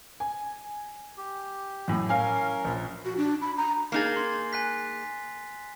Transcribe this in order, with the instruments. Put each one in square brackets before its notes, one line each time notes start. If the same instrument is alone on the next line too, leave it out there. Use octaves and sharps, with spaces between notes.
[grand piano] G#5
[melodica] G4
[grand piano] F#2 A2
[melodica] C#4 A#4 [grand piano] F5 G#5
[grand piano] A#1
[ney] F#4
D4
B5
A#5
[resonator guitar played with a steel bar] A#3 D#4 G#4 [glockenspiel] A6 C7
[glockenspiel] C6
G#5 F#6 B6